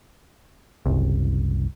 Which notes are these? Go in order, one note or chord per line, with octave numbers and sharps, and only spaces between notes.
F#1 C2